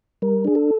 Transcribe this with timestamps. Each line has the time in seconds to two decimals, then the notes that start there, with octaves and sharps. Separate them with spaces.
0.22 G3 A#4
0.45 D4 G#4
0.55 A4